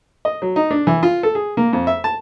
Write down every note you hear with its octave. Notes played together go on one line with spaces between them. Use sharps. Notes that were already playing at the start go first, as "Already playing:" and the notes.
D#5
F#3
D#4
D4
E3
F4
A4
G#4
A#3
F2
E5
A5